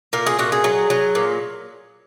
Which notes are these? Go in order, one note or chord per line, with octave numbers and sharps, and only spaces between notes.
A#2 A#4
G#4
A#2 F#4
G#4
F#3
F#3
A#2